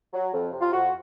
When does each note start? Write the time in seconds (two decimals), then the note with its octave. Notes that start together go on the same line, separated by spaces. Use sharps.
0.14 F#3
0.33 F2
0.52 C3
0.61 F4
0.73 F2 F#4